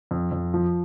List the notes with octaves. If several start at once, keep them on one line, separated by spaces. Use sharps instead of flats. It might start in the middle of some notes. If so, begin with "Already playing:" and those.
F2
F2
F3